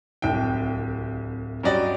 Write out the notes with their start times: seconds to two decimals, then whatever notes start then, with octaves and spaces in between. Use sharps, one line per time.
0.22 D1 C2 G5
1.63 G2 F#3 C#4 D5 D#5 G5